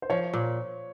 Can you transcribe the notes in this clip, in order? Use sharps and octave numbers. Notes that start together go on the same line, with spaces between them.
C5
F3 C#5
A#2